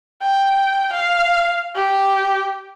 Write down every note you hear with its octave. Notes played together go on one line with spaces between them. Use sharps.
G5
F5
G4